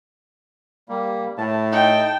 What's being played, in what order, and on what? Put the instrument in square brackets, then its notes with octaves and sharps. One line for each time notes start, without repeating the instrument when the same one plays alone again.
[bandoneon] G3 A#3
[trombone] A2 [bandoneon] A5
[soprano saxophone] D#4 [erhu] G5